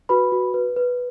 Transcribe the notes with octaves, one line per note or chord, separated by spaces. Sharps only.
F#4 B4 B5
F#4
B4
B4